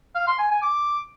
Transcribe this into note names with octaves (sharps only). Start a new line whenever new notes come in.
F5
C6
G#5
G#5
D6